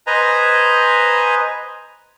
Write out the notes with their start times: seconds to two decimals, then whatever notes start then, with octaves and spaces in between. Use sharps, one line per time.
0.07 B4 C5 D#5 G#5 A#5